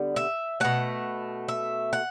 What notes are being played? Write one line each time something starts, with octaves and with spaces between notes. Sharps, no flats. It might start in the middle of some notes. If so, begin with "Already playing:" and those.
Already playing: D3 G3 B3
E5
B2 A3 F#5
E5
F#5